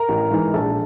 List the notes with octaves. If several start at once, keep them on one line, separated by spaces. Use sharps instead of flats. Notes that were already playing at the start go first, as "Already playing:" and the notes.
Already playing: A#4 A#5
A1
G#2 E3
A#1 A4 A5